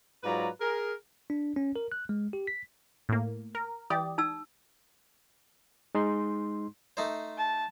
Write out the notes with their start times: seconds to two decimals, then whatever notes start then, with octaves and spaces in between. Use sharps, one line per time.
0.24 G#2 F#3 F4 B4 D5 A#5
0.61 G#4 A#4
1.30 D4
1.56 C#4
1.76 A#4
1.92 F#6
2.09 G#3
2.33 G4
2.47 B6
3.09 A2 A#3
3.55 A#4
3.90 E3 G4 D5 D#6
4.18 D#4 A5 E6
5.95 G#3 D#4 C6
6.97 A3 D#4 C5
7.38 A5